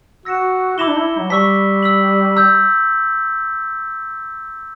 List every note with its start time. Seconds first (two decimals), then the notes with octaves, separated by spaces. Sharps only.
0.25 F#4 E6 A#6 C#7 E7
0.78 E4 B5 D6 A#6 E7 G7
0.87 D4
0.97 E4
1.18 F#3
1.30 G3 C#6 E6 B6
1.83 E6 B6 F#7
2.36 A#5 E6 G6